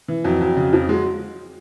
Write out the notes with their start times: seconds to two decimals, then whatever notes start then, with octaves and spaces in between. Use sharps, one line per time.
0.08 E3
0.24 F2 F#3
0.41 F2
0.56 C#3
0.73 F2 F3
0.89 F#3 G#3